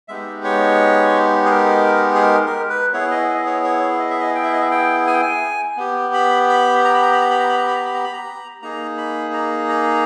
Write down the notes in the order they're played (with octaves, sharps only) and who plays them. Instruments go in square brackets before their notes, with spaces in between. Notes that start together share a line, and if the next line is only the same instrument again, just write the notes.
[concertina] G#3 B3 D#4 G4 E5
C#5
G#4
A#4
G#4
A#4
A#4
B4
B3 E4 G#4 C#5
D#5
D#5
C#5
C#5
D#5
E5
D#5
G5
E5
D#5
E5
G5
G#5
G5
G#5
B3 G4
B5
B5
A#5
B5
A#5
B5
A#5
B5
A#5
B5
A#5
B5
A#5
B5
A#5
B5
A#5
A#3 D#4 G#4 A#5
B5
A#5
A#5